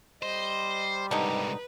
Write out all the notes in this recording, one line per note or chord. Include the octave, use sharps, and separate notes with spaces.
G3 C5 D#5
C2 G#2 D3 D#4 B4